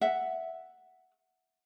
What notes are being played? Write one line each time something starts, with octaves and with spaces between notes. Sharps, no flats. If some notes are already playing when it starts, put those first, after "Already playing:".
E5 F#5